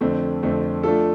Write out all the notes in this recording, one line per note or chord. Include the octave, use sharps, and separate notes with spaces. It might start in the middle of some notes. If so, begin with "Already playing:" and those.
F2 D3 A3 C4
F2 D3 A3 C4
F3 A3 D4 F4 A4